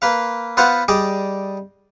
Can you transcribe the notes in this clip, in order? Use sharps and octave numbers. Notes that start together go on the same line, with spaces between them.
A#3 B4 F5
B3 F4 B4 C5 F5 F#5
G3 G#4 D5 D#5